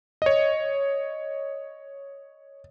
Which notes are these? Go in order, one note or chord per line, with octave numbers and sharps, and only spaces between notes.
C#5 D#5